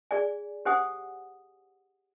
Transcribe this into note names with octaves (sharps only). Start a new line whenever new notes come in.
G#4 D5 G#5
G4 C5 F#5 G#5 D#6